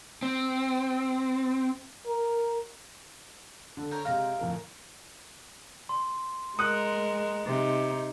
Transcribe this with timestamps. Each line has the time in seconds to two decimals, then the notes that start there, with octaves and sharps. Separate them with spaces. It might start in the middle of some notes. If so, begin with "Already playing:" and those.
0.23 C4
2.06 A#4
3.77 D3 A4
3.91 A#4 C#5 G5
4.05 C3 G#3 F5 G5 A#5
4.39 D1 F2 A#4
5.89 C6
6.59 G#3 A#4 D#6 F#6 C#7
7.45 C3 D#4